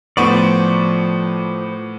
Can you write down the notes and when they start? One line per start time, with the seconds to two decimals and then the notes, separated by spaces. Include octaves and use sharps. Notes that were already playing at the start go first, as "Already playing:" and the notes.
0.17 A2 F3 B3 C5 D5 C#6